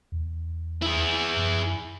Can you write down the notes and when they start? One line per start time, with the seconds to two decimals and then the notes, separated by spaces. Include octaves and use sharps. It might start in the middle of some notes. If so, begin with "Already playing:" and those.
0.12 E2
0.82 E4 G#4
1.37 F#2